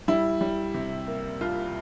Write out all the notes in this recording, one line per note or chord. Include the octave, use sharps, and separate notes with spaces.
G3 E4
G3
C3
A#3
C2 F4